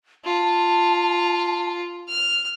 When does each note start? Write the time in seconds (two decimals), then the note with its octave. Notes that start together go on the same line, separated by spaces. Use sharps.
0.25 F4 A5
2.08 F6